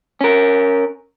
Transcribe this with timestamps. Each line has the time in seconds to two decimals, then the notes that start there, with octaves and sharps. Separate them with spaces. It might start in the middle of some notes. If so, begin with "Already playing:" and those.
0.21 C#4 A#4